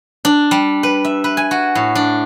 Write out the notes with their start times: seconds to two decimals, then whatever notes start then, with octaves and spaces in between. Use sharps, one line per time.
0.25 D4
0.51 G3
0.83 B4
1.05 E5
1.24 B4
1.37 G#5
1.51 F#4
1.75 A2
1.95 D4